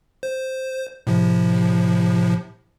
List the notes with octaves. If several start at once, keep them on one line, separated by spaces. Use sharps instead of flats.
C5
A2 C3 F3